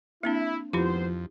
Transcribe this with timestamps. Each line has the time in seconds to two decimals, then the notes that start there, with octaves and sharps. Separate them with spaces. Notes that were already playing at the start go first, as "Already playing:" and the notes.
0.23 A#3 C4 D4 E4
0.73 G#1 F2 F3 B3 E4 F4 G4 C5